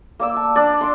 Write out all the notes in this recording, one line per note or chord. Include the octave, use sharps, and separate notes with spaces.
A#3 D5 E6
A5
D4 D5
C6 D6